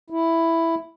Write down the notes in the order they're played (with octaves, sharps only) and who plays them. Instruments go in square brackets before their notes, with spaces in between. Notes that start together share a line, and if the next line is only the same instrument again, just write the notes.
[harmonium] E4